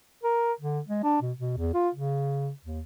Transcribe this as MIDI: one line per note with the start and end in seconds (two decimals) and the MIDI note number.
0.23 0.52 70
0.61 0.80 50
0.88 1.02 56
1.03 1.20 62
1.22 1.32 47
1.39 1.55 47
1.57 1.71 40
1.74 1.89 65
1.95 2.51 49
2.64 2.80 39